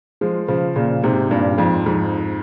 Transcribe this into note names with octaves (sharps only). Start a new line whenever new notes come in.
F3 G#3
C#3 F3
A#2 C#3
G#2 C3
G2 A#2
F2 G#2
F2 G#2